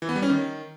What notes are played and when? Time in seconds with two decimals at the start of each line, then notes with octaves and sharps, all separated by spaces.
0.02 E3
0.09 B3
0.16 G3
0.23 C#4
0.29 D#3